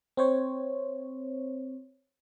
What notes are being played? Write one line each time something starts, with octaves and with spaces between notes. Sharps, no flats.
C4 C5 C#5